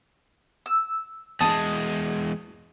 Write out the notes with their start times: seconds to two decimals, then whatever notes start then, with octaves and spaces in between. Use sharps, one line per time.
0.66 E6
1.41 E2 G#3 A5 D#6